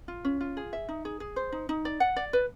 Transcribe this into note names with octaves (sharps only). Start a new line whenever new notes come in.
F4
C#4
F4
G#4
E5
D#4
G#4
G#4
C5
D#4
D#4
D5
F#5
D5
B4